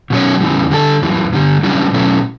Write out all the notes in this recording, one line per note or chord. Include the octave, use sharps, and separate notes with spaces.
B2 F#3 C#4 F#4 C#5
E2 C#3 E3 G3
D3 G3 D4 F#4 A4
F#2 E3 G3
G2 D3 G3
F#2 C#3 E3 G3 D4
B2 F#3 A3 C#4 E4